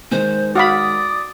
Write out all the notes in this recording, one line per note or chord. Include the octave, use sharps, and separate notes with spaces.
D#3 G#3 C5
F#4 D5 F5 B5 D#6